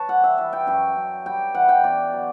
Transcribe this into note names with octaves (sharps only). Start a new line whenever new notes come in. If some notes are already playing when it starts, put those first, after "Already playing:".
Already playing: B4 C#5 A5
G3 F#5
E5
E3 E5
G5
F#2 G5
F#2
G3 G5
E3 F#5
G5
B2 D5
F#3